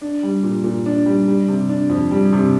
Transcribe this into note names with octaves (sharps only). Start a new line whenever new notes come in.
D4
G3
A#2
A#2
D4
G3
G3
C3
D4
F2
G3
C3